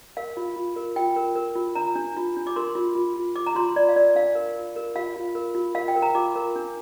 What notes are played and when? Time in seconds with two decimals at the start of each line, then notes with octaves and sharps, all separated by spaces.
0.17 A#4 F5
0.37 F4
0.56 F4
0.76 A#4
0.96 F4 G5
1.16 A#4
1.36 A#4
1.56 F4
1.75 D4 A#5
1.95 D4
2.17 F4
2.37 D4
2.47 D6
2.56 A#4 C6
2.75 F4
2.95 F4
3.16 F4
3.36 F4 D6
3.47 A#5
3.55 F4 C6
3.76 F4 D5
3.89 F5
3.96 A#4 D5
4.15 D4 F5
4.35 A#4
4.56 F4
4.76 A#4
4.95 F4 F5
5.16 F4
5.35 A#4
5.55 F4
5.75 A#4 F5
5.88 G5
5.96 A#4
6.02 A#5
6.15 F4 D6
6.36 A#4
6.56 D4